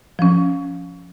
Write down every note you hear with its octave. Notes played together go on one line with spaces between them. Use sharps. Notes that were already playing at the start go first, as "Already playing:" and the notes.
F3 C#4